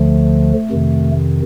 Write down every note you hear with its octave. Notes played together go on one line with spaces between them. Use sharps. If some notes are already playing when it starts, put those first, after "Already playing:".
Already playing: D2 D3 F3 A3
F2 C3 D#3